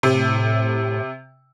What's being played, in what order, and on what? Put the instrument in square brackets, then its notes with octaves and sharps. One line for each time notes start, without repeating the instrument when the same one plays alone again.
[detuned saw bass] A2 [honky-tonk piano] C3